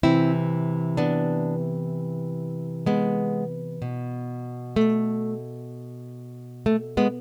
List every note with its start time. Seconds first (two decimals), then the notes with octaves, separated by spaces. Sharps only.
0.03 C3 E3 C4 E4
0.97 B3 D4
2.86 G#3 B3
3.82 B2
4.76 A3
6.66 A3
6.97 G#3 B3